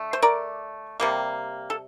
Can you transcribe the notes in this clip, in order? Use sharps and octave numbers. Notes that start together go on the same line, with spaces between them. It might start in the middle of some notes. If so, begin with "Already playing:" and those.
Already playing: D3 A3
C5
A#4 D5
C3 G3 A#3
A4